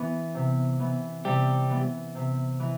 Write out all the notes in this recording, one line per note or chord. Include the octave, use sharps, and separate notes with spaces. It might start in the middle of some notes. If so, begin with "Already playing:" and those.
Already playing: E3 B3
C3
E3 B3
C3 G3 G4
E3 B3
C3
E3